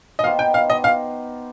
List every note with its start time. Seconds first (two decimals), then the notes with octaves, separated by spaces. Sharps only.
0.19 D#5
0.23 B3 D#4 G4 C5 F5
0.39 G5
0.54 F5
0.70 D#5
0.84 F5